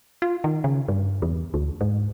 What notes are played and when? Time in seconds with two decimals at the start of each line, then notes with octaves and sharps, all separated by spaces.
0.22 F4
0.44 D#3
0.64 C#3
0.88 G2
1.22 E2
1.54 D2
1.81 G#2